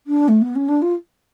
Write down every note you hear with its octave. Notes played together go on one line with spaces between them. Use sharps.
D4
A3
B3
C#4
D4
F4